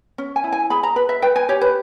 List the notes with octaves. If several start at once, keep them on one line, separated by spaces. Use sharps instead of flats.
C#4
G#5
E4
G#5
G#4 B5
A#5
B4 B5
E5
B4 G5
G#5
G4 C#5
B4